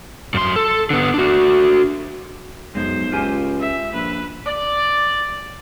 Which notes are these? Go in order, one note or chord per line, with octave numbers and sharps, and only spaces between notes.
F#2 C6
A4
D3 B3
D4 F#4
B1 F#2 G#3 C5
C#2 F4 G4 G#5
E5
A#1 B4
D5